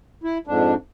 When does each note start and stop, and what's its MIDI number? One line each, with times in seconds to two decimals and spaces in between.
0.23 0.38 64
0.47 0.74 41
0.47 0.74 44
0.47 0.74 62